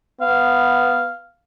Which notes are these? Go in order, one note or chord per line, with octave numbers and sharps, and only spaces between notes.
B3 F5